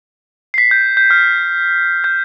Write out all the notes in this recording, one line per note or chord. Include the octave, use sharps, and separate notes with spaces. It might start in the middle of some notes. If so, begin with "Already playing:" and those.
C7
B6
G6
G6
F6
G6